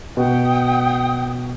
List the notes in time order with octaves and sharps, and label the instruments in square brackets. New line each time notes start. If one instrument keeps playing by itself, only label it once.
[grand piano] B2 [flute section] F#5 G5 D#6